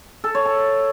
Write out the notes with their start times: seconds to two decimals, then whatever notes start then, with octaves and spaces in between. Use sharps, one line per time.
0.24 A4
0.35 C#5
0.45 A5